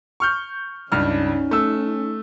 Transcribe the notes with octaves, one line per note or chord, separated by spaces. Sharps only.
C#6 F6 G6
C#2 G2 C#4 D#4 F6
A3 E6